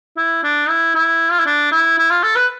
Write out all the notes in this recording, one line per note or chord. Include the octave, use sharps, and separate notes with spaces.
E4
D4
E4
E4
F4
E4
D4
E4
E4
F4
A4
B4